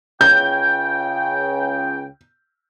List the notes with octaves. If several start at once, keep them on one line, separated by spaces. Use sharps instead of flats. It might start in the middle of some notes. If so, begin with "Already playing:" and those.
C#2 C#3 G5 G6